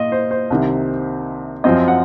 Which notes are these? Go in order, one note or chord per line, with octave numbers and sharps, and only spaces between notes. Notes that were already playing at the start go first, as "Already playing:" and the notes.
Already playing: A#2 D#5 F5
C5
C5
C2 C3 D#3
F#2 F3 C4 D#5
F#5